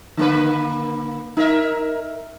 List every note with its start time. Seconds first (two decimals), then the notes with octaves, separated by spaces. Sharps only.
0.17 D3 A#3 B4
1.37 D#4 A#4 E5